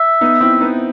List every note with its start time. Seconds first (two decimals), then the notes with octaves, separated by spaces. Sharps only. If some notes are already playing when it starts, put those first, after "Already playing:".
Already playing: E5
0.21 B3 D#4
0.41 C4 E4
0.61 B3 D#4